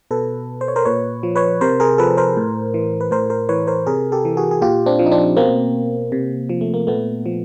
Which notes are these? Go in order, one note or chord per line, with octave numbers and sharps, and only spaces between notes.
B2 A4 B4
C5
C#5
A#4 C5
A#2 B4 C#5
F3
B4 C#5
C3 A#4 C5
G#4 A#4
F3 A4 B4
A#4 C5
A2
E3
B4
A2 A#4 C5
A#4 C5
E3 B4 C#5
A#4 C5
C3 G#4 A#4
G4 A4
E3
F#4 G#4
G#4
A#2 F4 G4
C4 D4
F3
D#4
C4 D4
B2 A#3 C4
C3
F3
A3
A#3
A#2 A3 B3
F3